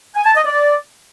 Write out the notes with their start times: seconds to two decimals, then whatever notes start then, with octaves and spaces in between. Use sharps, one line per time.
0.15 G#5
0.25 A5
0.35 D#5
0.45 D5